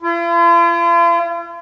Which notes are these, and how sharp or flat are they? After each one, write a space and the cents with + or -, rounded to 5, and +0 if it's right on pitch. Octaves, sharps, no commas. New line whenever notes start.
F4 -45